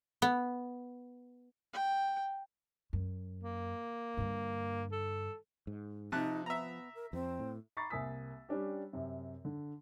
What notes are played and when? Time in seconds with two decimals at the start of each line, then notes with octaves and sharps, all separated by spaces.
0.22 B3
1.73 G5
2.93 F#2
3.43 A#3
4.17 G2 D3
4.92 A4
5.67 G#2
6.12 C3 F3 D#4 A5 F#6
6.46 B3 E5 A#5
6.95 A#4
7.13 F2 C4
7.39 A2
7.77 A#5 B5 C#6 D6 A6 C7
7.90 C2 A#3 G#5 D#6 E6 B6
8.49 G3 C#4 D4 G4
8.93 F#2 C3
9.45 D3